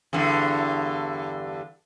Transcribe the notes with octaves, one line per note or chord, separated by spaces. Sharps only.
E2 G2 D3